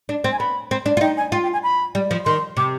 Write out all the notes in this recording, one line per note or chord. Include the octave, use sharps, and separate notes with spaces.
D4
C4
G#5
B3 B5
C4
D4
F4
D#4 G5
G#5
F4 G5
G5
G#5
B5
G3
F3
D#3 C6
C3 D6